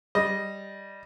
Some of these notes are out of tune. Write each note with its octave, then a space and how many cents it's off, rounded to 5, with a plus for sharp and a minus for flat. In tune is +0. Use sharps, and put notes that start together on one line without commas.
G3 +0 D#5 +0